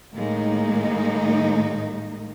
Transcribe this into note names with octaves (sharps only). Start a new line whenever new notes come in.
A2 D#3 G#3 A#3 D#4